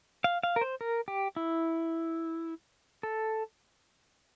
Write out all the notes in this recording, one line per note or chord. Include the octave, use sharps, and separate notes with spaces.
F5
F5
A#4
C5
A#4
G4
E4
A4